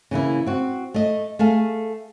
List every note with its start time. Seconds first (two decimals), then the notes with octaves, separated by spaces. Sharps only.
0.11 C#3 E3 A#3 E4
0.46 C4 F#4
0.94 A3 D#5
1.39 A3 G#4 A4 F5